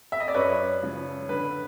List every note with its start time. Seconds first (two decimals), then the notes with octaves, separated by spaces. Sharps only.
0.12 E5
0.20 D#5
0.28 D5
0.34 F#2 B4 C#5
0.82 C#3 F3
1.29 D3 B4